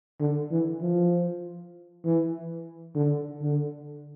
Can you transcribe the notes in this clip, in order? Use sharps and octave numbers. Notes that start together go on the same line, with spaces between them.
D3
E3
F3
E3
D3
D3